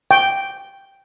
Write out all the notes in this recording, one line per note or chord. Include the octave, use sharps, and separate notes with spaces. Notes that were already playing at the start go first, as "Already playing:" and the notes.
G5